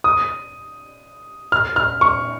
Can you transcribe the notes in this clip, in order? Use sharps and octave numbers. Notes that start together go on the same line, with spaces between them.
D#6
F6
F6
C#6